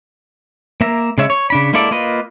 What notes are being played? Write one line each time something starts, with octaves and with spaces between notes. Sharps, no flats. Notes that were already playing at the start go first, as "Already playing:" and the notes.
A#3 E5 A#5
C#3 G#3 C#5 E5
C#5
C#3 D4 B5
G#3 A#3 E4 A4 D5
A#3 F4 B4 D#5